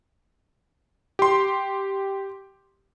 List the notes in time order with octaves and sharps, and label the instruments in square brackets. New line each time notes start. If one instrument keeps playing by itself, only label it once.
[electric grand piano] G4 C6